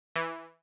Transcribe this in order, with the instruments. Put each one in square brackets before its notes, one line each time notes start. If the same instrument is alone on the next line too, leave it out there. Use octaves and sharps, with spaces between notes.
[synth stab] E3